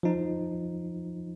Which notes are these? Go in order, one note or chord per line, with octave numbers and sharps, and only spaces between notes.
F3 D#4